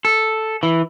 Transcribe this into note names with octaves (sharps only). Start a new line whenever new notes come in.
A4
E3